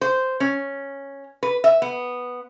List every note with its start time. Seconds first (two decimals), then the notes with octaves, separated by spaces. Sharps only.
0.01 C5
0.40 C#4
1.43 B4
1.64 E5
1.82 B3